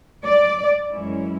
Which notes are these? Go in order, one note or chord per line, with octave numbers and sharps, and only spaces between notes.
D5
F#2 E3 G#3 C#4 E4